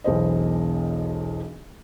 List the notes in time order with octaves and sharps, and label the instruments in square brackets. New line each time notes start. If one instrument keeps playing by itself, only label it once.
[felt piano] E1 B1 E3 C5 D#5